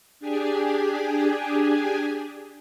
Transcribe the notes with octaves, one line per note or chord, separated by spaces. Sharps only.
D4 G4 G#4 G#5